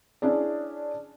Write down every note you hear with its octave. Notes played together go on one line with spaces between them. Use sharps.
C#4 D4 E4 G#4 D5